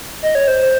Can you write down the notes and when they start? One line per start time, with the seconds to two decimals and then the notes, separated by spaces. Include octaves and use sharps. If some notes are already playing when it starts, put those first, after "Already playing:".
0.22 D#5
0.35 C#5
0.48 C5